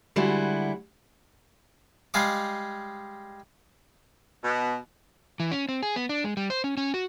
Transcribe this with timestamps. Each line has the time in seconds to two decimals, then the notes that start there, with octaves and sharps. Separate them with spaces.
0.16 D3 G3 G#3 E4 F#4
2.14 G3 G#3 G#4 F5 D6
4.45 B2
5.40 E3
5.52 C#4
5.69 C4
5.83 G#4
5.96 B3
6.09 D4
6.24 G#3
6.37 G3
6.50 C5
6.64 C#4
6.77 C#4
6.94 F#4